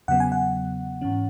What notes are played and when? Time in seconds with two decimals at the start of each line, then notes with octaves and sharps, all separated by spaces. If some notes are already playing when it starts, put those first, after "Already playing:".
0.08 E2 C#3 F#3 B3 F#5
0.20 G#5
0.32 F#5
1.01 G#2 E3 C#4